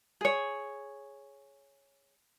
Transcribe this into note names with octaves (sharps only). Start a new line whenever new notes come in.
G#4 C#5